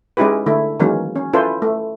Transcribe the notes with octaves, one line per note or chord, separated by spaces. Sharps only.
G#3 C#4 D#4 E4 G4 B4
D3 A3 E4
D#3 E3 F#3 G#3 A#3 C#4
C#4
C#4 E4 F4 A4 B4 C5
A3